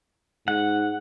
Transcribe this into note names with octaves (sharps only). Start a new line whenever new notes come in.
G#2 F#5